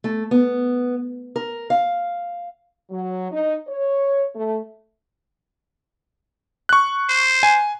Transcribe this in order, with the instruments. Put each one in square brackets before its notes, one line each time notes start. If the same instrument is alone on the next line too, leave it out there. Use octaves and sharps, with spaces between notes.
[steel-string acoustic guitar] A3
B3
A#4
F5
[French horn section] F#3
D#4
C#5
A3
[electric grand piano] C#6 F#6
[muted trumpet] C5
[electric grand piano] G#5